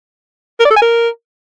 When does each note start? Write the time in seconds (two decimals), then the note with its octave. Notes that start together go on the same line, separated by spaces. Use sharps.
0.60 A#4
0.65 D5
0.71 A4
0.76 G#5
0.82 A#4